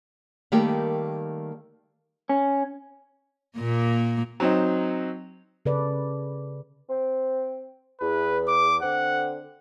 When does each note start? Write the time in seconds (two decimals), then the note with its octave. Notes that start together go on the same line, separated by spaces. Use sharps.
0.52 D#3 G3 A3 A#3 G4
2.29 C#4
3.58 A#2 A#3
4.40 F#3 C4 D#4
5.65 C#3 A4 B4 D5
6.89 C4
8.00 E2 B4
8.48 D6
8.82 D3 C4 F#5